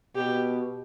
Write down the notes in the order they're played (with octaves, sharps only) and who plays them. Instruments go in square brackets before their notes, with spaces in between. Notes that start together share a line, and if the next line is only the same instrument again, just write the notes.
[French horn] B2 [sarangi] G4